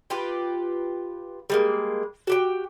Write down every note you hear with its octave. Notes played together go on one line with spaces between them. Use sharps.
F4 G4 B4
G3 G#3 A#3
F#4 G4 G5